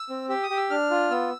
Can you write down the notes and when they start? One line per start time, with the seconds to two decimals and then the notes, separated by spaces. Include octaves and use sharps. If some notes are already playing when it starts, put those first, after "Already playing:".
Already playing: E6
0.10 C4
0.29 G4 E6
0.43 D#6
0.50 G4
0.57 E6
0.70 D4 F6
0.91 F4
1.10 B3 E6